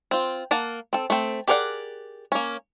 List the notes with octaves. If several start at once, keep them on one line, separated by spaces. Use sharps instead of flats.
C4 F4
A#3 F#5 A5
C4 A4
A3 C4
G4 G#4 A#4 D5 F#5
A#3 C#4